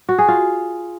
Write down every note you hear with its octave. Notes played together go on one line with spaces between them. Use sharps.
F#4
G#4
F4